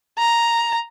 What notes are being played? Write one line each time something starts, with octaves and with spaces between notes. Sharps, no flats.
A#5